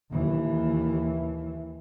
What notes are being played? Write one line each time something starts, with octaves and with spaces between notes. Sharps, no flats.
D#2 E3